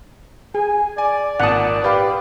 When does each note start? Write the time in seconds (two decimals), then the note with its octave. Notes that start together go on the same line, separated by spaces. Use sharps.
0.55 G#4 G#5
0.98 D5 G#5
1.40 G#1 A#2 F#5 A5 D#6
1.84 G4 B4 F5